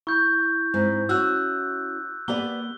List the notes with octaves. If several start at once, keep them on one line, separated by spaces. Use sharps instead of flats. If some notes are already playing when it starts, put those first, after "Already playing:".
E4 C#6 G6
G#2 C4
C#4 F#4 E6 F#6
A#3 B3 G4 D5 G7